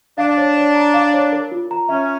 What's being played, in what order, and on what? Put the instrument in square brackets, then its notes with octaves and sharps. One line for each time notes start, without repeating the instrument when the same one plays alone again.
[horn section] D4 [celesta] F5
[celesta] C#5
C#5
A#5
F5
C#5
A#4
F4
A#5
[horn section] C#4 [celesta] E5